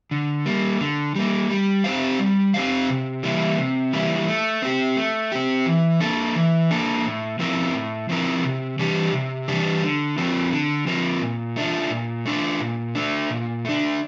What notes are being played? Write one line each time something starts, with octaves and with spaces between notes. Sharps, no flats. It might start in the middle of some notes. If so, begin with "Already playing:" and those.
D3
G3 A#3
D3
G3 A#3
G3
C4 G4 C5 F5
G3
C4 G4 C5 F5
C3
E3 G3 A#3 E4
C3
E3 G3 A#3 E4
A3
C4 G4
A3
C4 G4
E3
A#3 D4 A4
E3
A#3 D4 A4
A2
F3 C4 E4 A#4
A2
F3 C4 E4 A#4
C3
E3 G3 D4 G4
C3
E3 G3 D4 G4
D3
F3 C4 F4 A#4
D3
F3 C4 F4 A#4
A#2
A3 D4 F4
A#2
A3 D4 F4
A#2
A3 D4
A#2
A3 D4